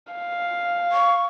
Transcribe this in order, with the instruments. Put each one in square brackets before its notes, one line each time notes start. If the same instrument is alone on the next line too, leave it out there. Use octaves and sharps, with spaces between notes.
[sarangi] F5
[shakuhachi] C#6